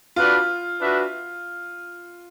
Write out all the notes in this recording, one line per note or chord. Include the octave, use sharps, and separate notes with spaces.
D4 F4 F#4 B4 D5
D4 F#4 B4 E5